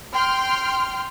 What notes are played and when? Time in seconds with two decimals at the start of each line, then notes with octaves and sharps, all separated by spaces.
0.12 G5 C6 F6